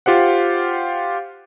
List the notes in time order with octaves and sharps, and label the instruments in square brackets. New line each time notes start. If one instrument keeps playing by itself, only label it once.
[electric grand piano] F4 G4 C5 F#5